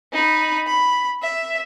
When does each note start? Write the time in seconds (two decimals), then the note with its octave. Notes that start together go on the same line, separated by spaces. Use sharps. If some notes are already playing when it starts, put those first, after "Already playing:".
0.13 D#4 B5
0.67 B5
1.22 E5